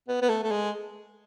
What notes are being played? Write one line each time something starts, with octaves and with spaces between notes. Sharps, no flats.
B3
B3
A3
A3
G#3